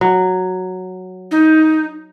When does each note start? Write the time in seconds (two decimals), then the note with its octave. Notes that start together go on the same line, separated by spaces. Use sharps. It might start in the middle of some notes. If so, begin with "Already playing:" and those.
0.01 F#3
1.31 D#4